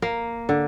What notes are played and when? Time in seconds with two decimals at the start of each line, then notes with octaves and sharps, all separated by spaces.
0.02 A#3
0.49 D3